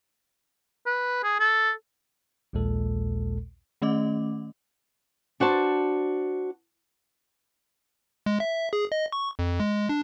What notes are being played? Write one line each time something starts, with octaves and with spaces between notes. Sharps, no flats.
B4
G#4
A4
A#1 D#2 A#2 G#3 A4
D#3 A3 C#4 D#5 D6
D4 F#4 C5 A5
G#3
E5
G#4
D#5
C#6
F2
G#3
D4